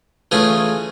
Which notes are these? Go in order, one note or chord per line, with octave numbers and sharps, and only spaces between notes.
E3 A3 C#4 F4 G#4